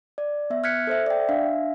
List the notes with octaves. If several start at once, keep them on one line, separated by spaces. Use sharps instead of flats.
D5
B3 E5
F6 F#6 G#6 B6 C#7
A4 C5 E5
D5 G5
D4 E5 F5